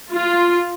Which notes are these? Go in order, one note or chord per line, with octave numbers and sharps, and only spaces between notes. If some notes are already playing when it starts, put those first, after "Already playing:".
F4